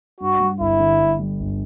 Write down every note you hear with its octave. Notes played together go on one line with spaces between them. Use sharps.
G2 F#4
G3
G1 E4
D3
G2
G3
G1